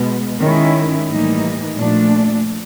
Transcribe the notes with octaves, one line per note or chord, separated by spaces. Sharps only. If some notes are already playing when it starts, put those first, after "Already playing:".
Already playing: B2 G#3 B3
D#3 G#3 C#4 E4
A2 E3 G3 A#3 D#4
A#2 F3 A3 D4